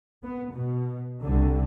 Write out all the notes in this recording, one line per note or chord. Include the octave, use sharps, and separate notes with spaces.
B3
B2
C2 D3